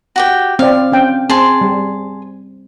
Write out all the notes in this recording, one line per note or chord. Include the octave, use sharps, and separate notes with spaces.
F#4 G4 G5
C4 D5 F5
C4 C#4 G5
C4 G#4 A5 C6
G3